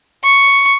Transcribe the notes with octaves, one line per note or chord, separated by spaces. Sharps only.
C#6